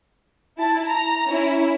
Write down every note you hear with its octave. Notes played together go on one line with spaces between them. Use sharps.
E4 A5
A#5
C#4 E4